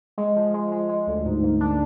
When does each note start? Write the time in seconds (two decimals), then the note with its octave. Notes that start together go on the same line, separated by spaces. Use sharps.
0.18 G#3
0.36 F3
0.54 G#3
0.72 G#3
0.89 G#3
1.07 D2
1.25 G#2
1.43 A#3
1.61 D4